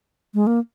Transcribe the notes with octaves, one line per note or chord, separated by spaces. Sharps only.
G#3
A#3